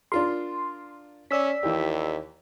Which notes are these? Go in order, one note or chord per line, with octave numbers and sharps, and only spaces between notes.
D4 F4 A#4 C6
C#4 D5 E6 B6
D#2 E3 G4